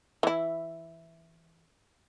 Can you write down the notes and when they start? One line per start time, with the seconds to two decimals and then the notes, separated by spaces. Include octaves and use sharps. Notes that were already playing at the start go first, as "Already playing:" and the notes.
0.23 E3 E4